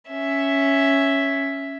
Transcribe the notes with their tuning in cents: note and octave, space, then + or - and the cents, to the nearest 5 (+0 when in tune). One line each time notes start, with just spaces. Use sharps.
C#4 +0 E5 +0